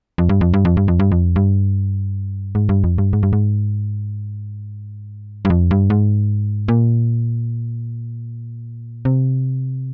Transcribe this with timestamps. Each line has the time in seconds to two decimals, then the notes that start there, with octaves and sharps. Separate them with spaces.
0.18 F2
0.29 G2
0.41 F2
0.54 G2
0.65 F2
0.77 G2
0.88 F2
0.99 G2
1.12 F2
1.36 G2
2.55 G#2
2.69 G2
2.84 F2
2.98 G2
3.13 G#2
3.23 G2
3.33 G#2
5.45 G2
5.50 F2
5.71 G2
5.90 G#2
6.68 A#2
9.05 C3